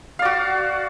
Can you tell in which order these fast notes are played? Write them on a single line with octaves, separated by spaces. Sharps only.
F5 D5 F#4